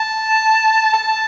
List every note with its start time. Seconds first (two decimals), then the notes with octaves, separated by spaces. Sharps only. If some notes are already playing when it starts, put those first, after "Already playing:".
Already playing: A5
0.94 A5